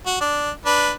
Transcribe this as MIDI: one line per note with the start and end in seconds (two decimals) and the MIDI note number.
0.06 0.16 66
0.21 0.51 62
0.65 0.91 62
0.65 0.91 71